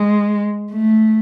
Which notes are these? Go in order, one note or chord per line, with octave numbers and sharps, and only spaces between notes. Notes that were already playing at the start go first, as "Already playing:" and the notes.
Already playing: G#3
A3